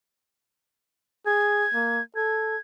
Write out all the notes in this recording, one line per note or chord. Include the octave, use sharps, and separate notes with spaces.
G#4 G#6
A#3
A4 G#6